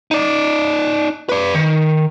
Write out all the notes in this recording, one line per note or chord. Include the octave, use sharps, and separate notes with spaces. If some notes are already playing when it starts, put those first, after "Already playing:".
D#4 D5
B4 D5
D#3